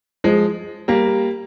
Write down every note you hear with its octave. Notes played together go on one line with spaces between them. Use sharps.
F3 G#3
G3 A#3